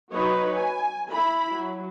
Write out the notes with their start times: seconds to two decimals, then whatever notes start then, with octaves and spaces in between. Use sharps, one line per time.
0.11 F#3 D#4 F#4 B4 C#5 D#5
0.54 G#5
1.09 E4 B5
1.50 F#3